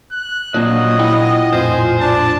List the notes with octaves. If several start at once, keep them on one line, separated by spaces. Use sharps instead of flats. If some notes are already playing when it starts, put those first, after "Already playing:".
F#6
A#2 F3 F#3 A#3 D4 D5 D#5 F#6
E4 F#5 G5
A#1 F2 A2 F4 C5 G#5
D4 A5